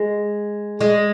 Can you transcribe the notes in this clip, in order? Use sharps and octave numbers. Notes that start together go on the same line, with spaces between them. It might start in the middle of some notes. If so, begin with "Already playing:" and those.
Already playing: G#3
G#3